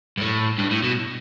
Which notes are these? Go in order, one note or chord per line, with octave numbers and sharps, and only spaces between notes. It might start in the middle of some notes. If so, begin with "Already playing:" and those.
G2
A2
G2
A2
B2